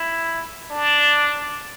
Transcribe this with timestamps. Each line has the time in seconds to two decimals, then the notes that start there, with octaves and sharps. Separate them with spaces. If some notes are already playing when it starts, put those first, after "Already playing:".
Already playing: E4
0.71 D4